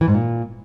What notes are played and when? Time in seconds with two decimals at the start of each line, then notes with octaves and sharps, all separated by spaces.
0.01 E3
0.08 G#2
0.14 A#2